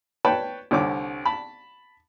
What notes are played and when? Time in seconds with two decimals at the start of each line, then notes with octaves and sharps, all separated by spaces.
0.25 B4 C#5 G5 A5 B5
0.71 C2 D3 C#5 D6
1.26 A5 B5